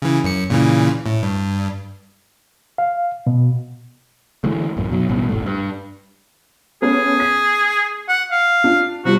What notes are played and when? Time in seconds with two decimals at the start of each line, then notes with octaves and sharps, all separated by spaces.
0.02 C#3 E3
0.24 F#2 C#7
0.50 A#2 C#3 E3
1.06 A2
1.23 G2
2.78 F5
3.27 B2
4.44 D3 E3 G#3 A3
4.77 A1 F#2
4.92 B2 F#3
5.09 A1 G2 B2
5.29 F1 A#1 G#2 A3
5.46 G2
6.82 A3 B3 C#4 G#4
7.20 B6
8.09 F#5
8.31 F5
8.64 D4 F4
9.05 C3 F3 G3 F#4